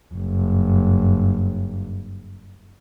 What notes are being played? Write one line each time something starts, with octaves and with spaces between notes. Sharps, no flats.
F#1 G2